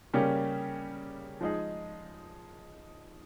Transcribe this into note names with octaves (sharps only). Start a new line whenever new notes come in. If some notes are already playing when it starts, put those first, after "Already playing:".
C#3 G3 A#3 C#4 G4
F3 G#3 D#4 G#4